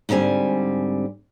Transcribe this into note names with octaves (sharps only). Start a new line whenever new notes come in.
G#2 D3 G3 C4 G#5